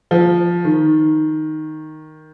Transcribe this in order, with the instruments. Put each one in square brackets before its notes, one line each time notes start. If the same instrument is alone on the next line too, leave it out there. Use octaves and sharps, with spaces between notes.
[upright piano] F3
D#3